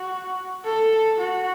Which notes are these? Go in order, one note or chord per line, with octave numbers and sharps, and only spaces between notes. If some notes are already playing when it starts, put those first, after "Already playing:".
Already playing: F#4
A4
F#4